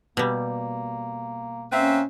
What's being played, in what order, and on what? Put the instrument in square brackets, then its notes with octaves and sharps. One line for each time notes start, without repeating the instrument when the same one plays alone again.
[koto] B2 G3 [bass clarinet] A#3
[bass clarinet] A#3 [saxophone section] C4 B4 E5 [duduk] C#4